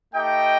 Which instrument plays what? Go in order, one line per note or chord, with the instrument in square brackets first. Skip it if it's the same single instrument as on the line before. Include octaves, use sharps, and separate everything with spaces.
[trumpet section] A3 D#4 G4 D#5 G5